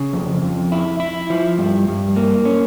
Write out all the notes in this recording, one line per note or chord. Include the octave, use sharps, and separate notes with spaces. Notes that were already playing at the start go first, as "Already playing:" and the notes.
Already playing: C#3
F2
F2
E4
E4
F3
G2
G2
A#3
C#4